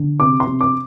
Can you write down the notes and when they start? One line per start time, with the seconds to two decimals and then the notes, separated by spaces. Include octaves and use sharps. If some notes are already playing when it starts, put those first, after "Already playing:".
Already playing: D3
0.20 C3 D6
0.40 C6
0.46 C3
0.61 D6